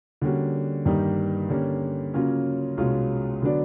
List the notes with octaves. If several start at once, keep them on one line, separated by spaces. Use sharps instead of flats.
D3 G3 A#3 C#4 F#4
G2 D#3 G3 A#3 D#4
D3 G3 A#3 C#4
C#3 F#3 A#3 C#4 F4
C2 B2 G#3 C#4 F4
D3 F#3 B3 D4